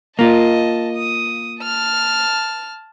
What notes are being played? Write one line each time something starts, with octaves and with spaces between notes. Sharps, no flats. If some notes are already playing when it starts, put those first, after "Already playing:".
A#3 F4 D#5 A5
D#6
A5 F6